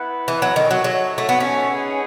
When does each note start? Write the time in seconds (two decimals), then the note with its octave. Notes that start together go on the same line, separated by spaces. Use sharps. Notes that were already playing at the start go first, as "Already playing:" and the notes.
Already playing: B3 E4 B4 F#5
0.28 E3
0.42 F#3
0.56 D#3 D#4 A4 C#5 E5
0.71 F#3
0.84 F#3
1.18 A3
1.29 B3
1.40 C#4
1.69 D#4 G#4 B4 F#5